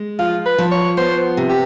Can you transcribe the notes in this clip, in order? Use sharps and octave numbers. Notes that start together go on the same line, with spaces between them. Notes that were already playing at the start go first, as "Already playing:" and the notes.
Already playing: G#3
F3 F4
B4
F3
C#5
B3 C5
C3
G4